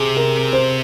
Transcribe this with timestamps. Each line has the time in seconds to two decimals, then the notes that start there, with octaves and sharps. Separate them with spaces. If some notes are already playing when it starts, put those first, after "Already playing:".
Already playing: C3 G#4
0.17 A#4
0.53 C5